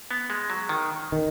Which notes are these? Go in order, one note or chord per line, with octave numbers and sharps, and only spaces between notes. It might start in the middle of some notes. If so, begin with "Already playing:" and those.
B3
G#3
F#3
D#3
D#3